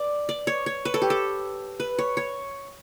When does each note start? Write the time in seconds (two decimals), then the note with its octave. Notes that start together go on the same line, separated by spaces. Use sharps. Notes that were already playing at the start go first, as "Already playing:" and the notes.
Already playing: D5
0.29 D5
0.47 C#5
0.66 C#5
0.85 B4
0.94 A4
1.02 G4
1.10 A4
1.80 B4
1.99 C#5
2.17 C#5